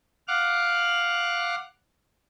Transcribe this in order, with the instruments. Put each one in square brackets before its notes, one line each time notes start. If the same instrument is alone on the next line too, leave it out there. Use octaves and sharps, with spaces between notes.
[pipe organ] F5 F#5 D6 F6 F#6